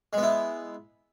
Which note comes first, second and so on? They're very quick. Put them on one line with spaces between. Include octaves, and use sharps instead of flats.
G#3 B3 E4